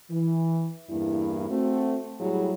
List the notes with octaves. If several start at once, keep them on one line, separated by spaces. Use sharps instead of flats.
E3
E2 G2 A#3 E4
A3 C4 F#4
A2 F#3 G3 E4 G#4